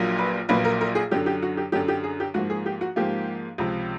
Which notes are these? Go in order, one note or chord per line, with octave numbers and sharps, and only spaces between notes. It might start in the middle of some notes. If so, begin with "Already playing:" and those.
Already playing: A#1 A#2 F#3 A#3
B4
A#1 A#2 F#3 A#3 B4
A#4
A#4
G#4
F#2 D3 F#3 G4
G4
F#4
G4
F#2 D3 F#3 G4
G4
G#4
G4
G#2 F3 A#3 F#4
G#4
G4
F#4
G#2 F3 A#3 G4
C#2 C3 F3